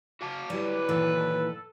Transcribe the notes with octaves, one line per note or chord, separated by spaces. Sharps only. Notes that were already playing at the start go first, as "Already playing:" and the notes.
F#4 F5 A5 D6
F#3 G3 E4 B4
A#2 D#3 E3 A4